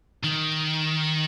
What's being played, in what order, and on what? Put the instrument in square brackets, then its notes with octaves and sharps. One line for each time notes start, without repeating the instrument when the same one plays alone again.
[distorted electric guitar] D#3